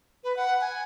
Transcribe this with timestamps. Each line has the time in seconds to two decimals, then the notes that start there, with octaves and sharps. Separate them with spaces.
0.24 B4
0.37 F#5
0.61 G#5